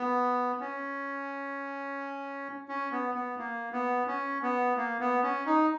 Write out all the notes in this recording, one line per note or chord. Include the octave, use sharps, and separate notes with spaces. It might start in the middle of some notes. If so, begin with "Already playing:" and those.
Already playing: B3
C#4
C#4
B3
B3
A#3
B3
C#4
B3
A#3
B3
C#4
D#4